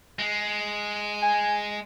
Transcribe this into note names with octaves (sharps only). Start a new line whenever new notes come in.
G#3
G#5